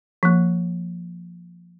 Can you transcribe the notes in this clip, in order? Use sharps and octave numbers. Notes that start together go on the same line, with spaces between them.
F3 A#3